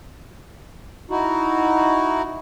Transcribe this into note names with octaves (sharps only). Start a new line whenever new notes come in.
D#4 E4 F#4